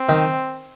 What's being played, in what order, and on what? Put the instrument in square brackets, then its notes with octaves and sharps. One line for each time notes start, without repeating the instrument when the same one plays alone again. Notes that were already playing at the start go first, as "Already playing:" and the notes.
Already playing: [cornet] C4
[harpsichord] D#3